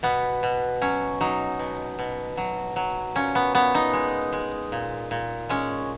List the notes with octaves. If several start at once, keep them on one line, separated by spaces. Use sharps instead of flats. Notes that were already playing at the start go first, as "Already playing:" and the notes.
B2 B3
B2
F#3 C#4
F#3 D#4
B2
B2
F#3
F#3
A#2 C#4
B3
A#2 B3
D#4
G#3
G#3
A#2
A#2
G#3 C#4